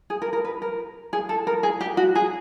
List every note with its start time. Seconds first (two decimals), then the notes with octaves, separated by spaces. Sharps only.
0.10 G#4
0.22 A#4
0.33 A#4
0.45 B4
0.62 A#4
1.13 G#4
1.29 A4
1.47 A#4
1.63 G#4
1.81 G4
1.97 F#4
2.15 G#4